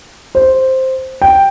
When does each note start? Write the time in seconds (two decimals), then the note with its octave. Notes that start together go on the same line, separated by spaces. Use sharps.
0.35 C5
1.22 G5